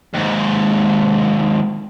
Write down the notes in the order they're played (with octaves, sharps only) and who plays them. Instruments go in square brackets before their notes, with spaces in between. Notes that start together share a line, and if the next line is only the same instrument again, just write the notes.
[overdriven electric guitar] D#2 G#2